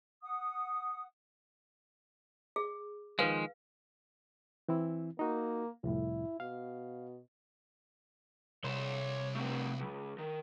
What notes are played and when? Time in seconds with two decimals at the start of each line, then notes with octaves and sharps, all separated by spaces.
0.22 F#5 D#6
2.56 G#4
3.19 D#3 F3 G#3 B4 F5
4.69 E3 C4 E4
5.19 A#3 D#4 F#4
5.84 C2 F2 A2 E4
6.40 B2 F5
8.64 C2 C#5 C6
9.35 A3 C4
9.79 C#2
10.18 D#3